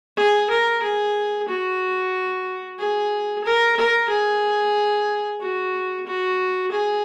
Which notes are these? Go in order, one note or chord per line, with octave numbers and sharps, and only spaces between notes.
G#4
A#4
G#4
F#4
G#4
A#4
A#4
G#4
F#4
F#4
G#4